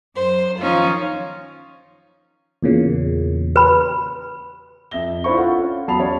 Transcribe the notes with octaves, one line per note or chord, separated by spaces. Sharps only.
F#2 C5
D#3 F3 C#4 D#4 F4
E2 A#2 C#3
B4 B5
F2 E5 A#6 G7
D4 E4 F4 C5 B5 C#6
F4 A4 F5 F#5
C#4
E2 F#3 A5 B5 C7 F7
C#4 C#5 D5